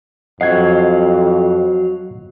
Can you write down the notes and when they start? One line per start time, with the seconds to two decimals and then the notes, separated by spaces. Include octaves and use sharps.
0.41 F2 F#3 D#5 F5 F#5 G#6